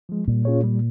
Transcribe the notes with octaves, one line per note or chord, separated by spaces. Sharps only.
F3 G#3
A#2 G3
C#4 F4 G#4 C#5
G3